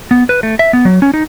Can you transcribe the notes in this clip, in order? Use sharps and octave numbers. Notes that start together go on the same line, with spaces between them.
B3
B4
A3
E5
B3
F#3
C#4
D#4